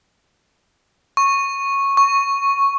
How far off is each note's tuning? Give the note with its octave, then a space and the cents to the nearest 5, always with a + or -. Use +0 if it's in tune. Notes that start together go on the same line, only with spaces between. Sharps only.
C#6 -10
C#6 +0